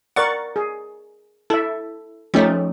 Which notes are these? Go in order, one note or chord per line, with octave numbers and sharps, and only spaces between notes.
A#4 D5 F#5 C#6 A6
G#4
E4 A4 E5
F3 A3 C#4 D#4 G4